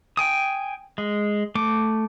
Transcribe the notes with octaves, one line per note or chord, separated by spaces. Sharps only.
G5 G#5 D#6
G#3
A3 D6